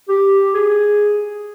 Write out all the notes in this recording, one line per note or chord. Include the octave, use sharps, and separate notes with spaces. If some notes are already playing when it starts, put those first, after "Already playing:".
G4
G#4